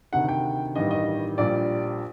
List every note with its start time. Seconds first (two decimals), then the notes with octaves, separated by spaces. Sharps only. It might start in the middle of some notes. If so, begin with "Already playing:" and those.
0.13 D2 C3 D#3 F#5
0.29 G5
0.75 A1 G2 D#3 G3 D#5
0.91 D#5
1.38 A#1 A#2 G3 D5